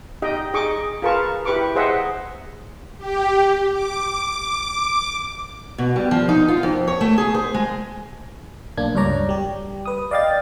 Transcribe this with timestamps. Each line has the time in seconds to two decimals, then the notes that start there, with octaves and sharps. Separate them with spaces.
0.22 D#4 G4 D#5 G5
0.54 D#4 G#4 D#5 C#6 D6
1.02 F4 G#4 A#4 B4 A5 C#6
1.45 E4 G4 B4 C#6 D6
1.76 G#4 C5 D#5 E5 F#5
2.97 G4
3.72 D6
5.78 B2
5.96 G3
6.11 F3
6.29 D#4
6.48 F4
6.63 F2
6.88 C#5
7.01 A3
7.18 G#4
7.35 C5
7.54 G#3
8.77 B1 A#3 D4 G#6
8.95 C#2 G2 D4 C#5 D5 A#5
9.29 G3 G4
9.86 B4 D#6
10.11 D5 D#5 F5 G5 A6